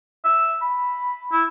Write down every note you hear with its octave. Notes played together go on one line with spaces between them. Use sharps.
E5
B5
E4